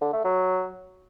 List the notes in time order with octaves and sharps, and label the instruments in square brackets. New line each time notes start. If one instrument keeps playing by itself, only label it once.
[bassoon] D3
A3
F#3